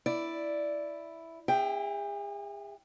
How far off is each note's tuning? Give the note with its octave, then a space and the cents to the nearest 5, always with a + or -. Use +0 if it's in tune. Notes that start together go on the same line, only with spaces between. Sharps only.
E4 +0 D5 +0
G#4 -40 E5 +0 G5 +0